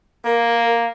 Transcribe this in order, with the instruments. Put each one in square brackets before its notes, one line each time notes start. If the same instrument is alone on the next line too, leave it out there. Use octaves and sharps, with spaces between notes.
[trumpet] A#3 [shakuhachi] A#4